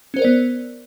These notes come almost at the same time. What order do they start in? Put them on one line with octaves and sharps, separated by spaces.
C#4 C5 A#4 D5 B3